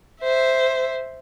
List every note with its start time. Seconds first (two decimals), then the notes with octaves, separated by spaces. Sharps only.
0.22 C5 E5